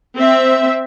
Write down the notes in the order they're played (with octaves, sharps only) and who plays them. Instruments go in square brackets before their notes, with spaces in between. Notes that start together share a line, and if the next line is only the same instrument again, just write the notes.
[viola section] C4 E5